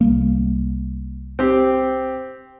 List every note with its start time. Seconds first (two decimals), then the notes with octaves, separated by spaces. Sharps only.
0.01 C2 G3 A#3
1.39 C4 G4